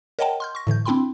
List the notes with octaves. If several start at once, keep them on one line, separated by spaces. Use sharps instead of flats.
A#4 C#5 D#5 F#5 G5 A5
C6 F6 G6
C#6 A#6
A2 D3 E3 G6
C4 D4 E4 G5 B5 C6